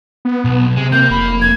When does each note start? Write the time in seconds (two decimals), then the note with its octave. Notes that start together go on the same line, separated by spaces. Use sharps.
0.25 B3
0.45 B1
0.76 C3 G#3
0.92 A#3 G6
1.11 F1 B5
1.41 G#6